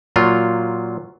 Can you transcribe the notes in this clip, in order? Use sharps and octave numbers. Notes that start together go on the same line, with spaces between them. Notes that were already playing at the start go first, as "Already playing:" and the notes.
A#2 F#3 F4